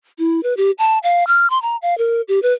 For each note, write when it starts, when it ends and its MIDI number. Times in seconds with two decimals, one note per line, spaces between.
0.19 0.43 64
0.43 0.56 71
0.57 0.71 67
0.78 0.99 81
1.03 1.26 77
1.27 1.49 89
1.50 1.61 84
1.62 1.76 82
1.82 1.97 77
1.98 2.21 70
2.28 2.40 67
2.43 2.53 71